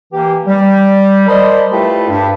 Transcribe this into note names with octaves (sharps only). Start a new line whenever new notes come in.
E3 A#3 G4
G3
A#4 C5 D5 D#5 A5 B5
A3 E4 F4 G4 A4 B4
G2